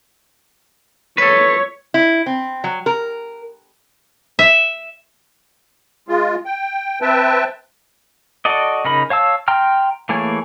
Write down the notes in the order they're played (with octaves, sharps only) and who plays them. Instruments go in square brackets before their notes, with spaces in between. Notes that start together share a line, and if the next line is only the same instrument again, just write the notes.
[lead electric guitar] A4 B4 [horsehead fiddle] C#5
[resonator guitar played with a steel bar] E4
C4
F#3
A#4
[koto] E5
[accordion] G#3 F4
G5
C4 B4 E5 G5 A5
[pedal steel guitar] F#4 A4 D5 D#5
C#3 D#4 A#4 B5
C#5 F5 A5 E6
G5 A#5 C6 F6
E3 A3 A#3 G#4 C#5